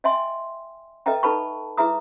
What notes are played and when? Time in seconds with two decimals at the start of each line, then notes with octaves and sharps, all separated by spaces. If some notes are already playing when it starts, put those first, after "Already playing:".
0.04 D#5 E5 G5 G#5 C6
1.06 A4 B4 D#5 E5 G5 A#5
1.23 D#4 A4 B4 A5 B5 C#6
1.77 E4 G#4 B4 E5 A#5 D#6